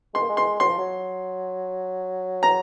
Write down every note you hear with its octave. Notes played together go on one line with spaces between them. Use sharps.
G#3 C6
A#3
G#3
C6
F#3 C6
F3
F#3
A#5